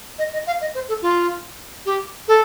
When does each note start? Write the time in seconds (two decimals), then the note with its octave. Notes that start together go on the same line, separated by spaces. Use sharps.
0.19 D#5
0.33 D#5
0.47 F5
0.61 D#5
0.75 C5
0.88 A4
1.02 F4
1.85 G4
2.28 A4